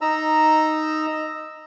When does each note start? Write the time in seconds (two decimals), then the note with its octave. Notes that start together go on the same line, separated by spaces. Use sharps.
0.01 D#4 A#5 E6